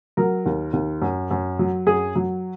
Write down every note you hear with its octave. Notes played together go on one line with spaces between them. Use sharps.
F#3 A#4
D#2
D#2
F#2
F#2
F#3
F#2 G#4
F#3